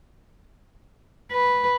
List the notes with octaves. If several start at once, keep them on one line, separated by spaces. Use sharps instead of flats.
B4